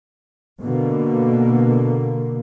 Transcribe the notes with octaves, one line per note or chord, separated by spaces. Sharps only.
B2 D3 A#3